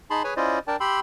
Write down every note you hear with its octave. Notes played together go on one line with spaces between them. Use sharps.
D#4 G#4 A5 B5 C6
G#4 B4 C#5 G#5
C#4 E4 F4 C5 D5 D#5
D4 A#4 D5 G5 A5
G4 G5 B5 C6 E6